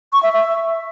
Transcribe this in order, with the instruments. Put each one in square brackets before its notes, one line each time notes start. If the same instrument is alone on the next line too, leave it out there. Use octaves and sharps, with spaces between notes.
[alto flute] C#6
E5
E5